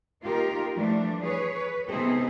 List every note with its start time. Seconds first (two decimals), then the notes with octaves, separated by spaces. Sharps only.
0.23 A#3 D#4 F4 G4 A#4
0.74 E3 F3 G3 A3 D4
1.23 G#4 B4 C#5
1.54 B4
1.87 C3 B3 C4 D#4 G#4 A4